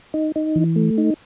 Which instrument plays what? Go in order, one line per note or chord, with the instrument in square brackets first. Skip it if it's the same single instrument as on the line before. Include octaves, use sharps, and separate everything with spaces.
[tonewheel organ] D#4
D#4
E3
A3
D#4